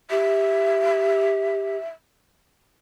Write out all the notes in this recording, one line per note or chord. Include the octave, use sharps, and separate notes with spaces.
G4 E5